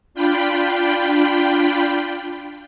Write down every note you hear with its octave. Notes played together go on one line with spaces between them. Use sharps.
D4 F4 G5 B5